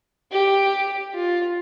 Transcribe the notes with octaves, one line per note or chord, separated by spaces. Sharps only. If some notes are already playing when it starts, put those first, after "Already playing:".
G4
F4